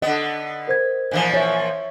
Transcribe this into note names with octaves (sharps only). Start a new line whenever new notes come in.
D3 B3 D#5
A#4 C5 G#6
A#2 E3 F3
C#5 E5